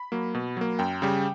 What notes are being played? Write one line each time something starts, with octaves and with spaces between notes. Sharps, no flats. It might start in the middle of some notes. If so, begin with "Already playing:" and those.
Already playing: B5
F#3 A#3
B2
F#3 A#3
F#2 G5
C#3 G3